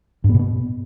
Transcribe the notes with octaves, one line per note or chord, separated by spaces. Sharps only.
G2
B3
B2
B3